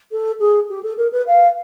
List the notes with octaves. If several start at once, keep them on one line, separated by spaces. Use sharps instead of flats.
A4
G#4
G4
A4
A#4
B4
F5